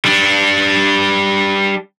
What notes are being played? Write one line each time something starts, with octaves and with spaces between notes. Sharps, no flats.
G3 D4